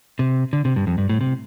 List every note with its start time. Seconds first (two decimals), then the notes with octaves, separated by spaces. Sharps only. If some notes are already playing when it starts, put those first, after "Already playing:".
0.19 C3
0.53 D3
0.65 C3
0.76 G2
0.87 F2
0.98 G2
1.09 A2
1.21 C3